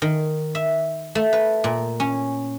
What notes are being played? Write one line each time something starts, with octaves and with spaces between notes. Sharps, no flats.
D#3
E5
A3
B4
A#2
C#4